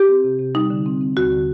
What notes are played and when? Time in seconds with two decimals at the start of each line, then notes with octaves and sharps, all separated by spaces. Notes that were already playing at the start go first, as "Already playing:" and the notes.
Already playing: G4
0.09 C4
0.24 C3
0.39 C3
0.55 G3 D#4
0.70 D3
0.86 C4
1.01 C4
1.17 D#2 F#4
1.31 D3